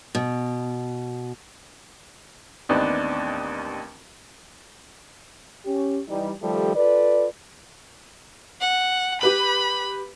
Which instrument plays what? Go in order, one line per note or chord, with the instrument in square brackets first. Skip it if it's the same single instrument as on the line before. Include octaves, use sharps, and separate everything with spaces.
[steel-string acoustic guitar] B2
[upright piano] A1 D#2 B3 C4 D4 D#4
[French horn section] C#4 G4
E3 G3 D#4
D#3 F3 G3 A3 G4 A4
F4 A4 B4 D5
[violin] F#5
[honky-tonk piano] G4 B4 F#7 [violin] B5